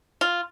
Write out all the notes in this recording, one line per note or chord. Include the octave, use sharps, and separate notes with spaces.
F4